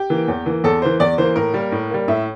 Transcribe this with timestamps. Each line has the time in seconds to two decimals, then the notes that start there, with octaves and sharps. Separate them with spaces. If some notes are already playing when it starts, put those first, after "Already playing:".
Already playing: G4
0.10 E3 A#3
0.28 E2
0.46 E3 A#3
0.64 E2 A4
0.82 E3 A#3 C5
1.00 E2 D5
1.18 E3 A#3 C5
1.36 A2 A#4
1.54 G3 A#3
1.72 A2
1.90 G3 A#3
2.08 A2 E5